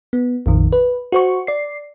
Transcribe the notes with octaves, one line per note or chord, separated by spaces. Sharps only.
B3
A#1 F2 D#3
B4
F#4 C5 C#6
D5 C7